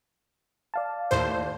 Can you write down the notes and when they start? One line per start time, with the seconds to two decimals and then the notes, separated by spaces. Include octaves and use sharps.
0.74 D5 F5 A5
1.11 D#2 A2 C5